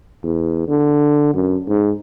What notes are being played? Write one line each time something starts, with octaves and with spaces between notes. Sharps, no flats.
E2
D3
F#2
G#2